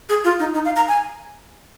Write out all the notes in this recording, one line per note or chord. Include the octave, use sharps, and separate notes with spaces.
G#4
F4
D#4
D#4
F5
A#5
G#5